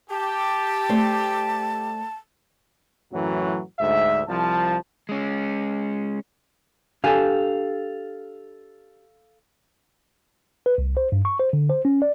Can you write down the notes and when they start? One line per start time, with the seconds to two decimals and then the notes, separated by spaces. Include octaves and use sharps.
0.10 G4 A5
0.89 A3 C5 D5
3.13 F#2 A2 E3 F#3
3.80 D2 G#2 E5
4.28 C2 F3 A5
5.09 G#3 C#4
7.04 D4 G4 A4 F5 G#5
10.66 B4
10.78 C2
10.97 C5
11.12 G2
11.25 C#6
11.39 C5
11.53 D3
11.70 C5
11.85 C#4
12.02 D5